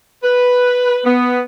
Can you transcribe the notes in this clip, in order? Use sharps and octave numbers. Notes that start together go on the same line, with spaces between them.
B4
B3